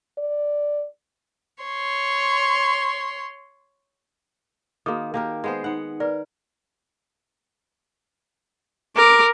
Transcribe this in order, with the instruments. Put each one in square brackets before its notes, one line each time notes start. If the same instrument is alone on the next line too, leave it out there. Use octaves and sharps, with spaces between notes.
[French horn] D5
[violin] C#5 C6
[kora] D#3 A#3 [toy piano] F#4 G#4 D#6
[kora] A#3 G4 A#4 [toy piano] A5
[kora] G#3 B3 C5
[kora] B3 F#5 [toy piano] D#4
[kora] A#4 [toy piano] B4 D5
[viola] A#4 [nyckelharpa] D6